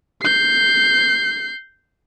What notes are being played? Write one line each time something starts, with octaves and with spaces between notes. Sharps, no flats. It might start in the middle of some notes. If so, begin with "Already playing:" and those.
G6 C7